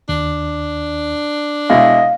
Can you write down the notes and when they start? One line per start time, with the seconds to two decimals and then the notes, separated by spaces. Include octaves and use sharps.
0.09 D#2 D4
1.70 B2 G#3 E4 D#5 F5